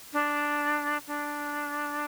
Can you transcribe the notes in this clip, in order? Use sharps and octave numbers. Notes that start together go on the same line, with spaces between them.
D4
D4